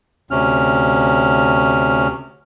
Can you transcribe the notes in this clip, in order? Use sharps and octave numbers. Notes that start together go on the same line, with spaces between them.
D2 C3 C#4 F6